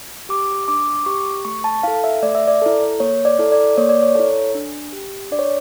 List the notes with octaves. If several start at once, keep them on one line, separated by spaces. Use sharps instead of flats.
G4 D6
D4 D6
D6
G4 C#6
A3 C#6
A5
E4 A4 F5
E5
A3 D5
E5
D5
E4 A4
A#3 C#5
D5
E4 A4
D5
A#3 C#5
D5
C#5
E4 A4 C#5
D4
G4
D4 D5
C#5